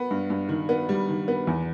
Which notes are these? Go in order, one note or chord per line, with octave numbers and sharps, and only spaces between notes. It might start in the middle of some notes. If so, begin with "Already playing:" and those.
Already playing: B3
G2
G2
D#3
B3
G3
D#3
B3
E2